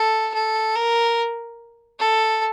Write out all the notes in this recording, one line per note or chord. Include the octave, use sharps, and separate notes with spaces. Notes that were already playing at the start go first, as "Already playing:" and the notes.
Already playing: A4
A4
A#4
A4